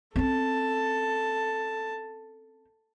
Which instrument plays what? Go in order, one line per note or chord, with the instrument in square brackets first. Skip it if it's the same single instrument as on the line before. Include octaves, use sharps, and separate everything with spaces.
[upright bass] C4 C#4 [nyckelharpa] A4 A5